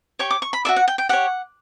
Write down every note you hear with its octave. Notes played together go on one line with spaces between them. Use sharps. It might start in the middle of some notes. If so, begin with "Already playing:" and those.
G4 C#5 C#6
D6
C#6
B5
F#4 A4 D5 E5
F#5
G5
G5
G4 C#5 F#5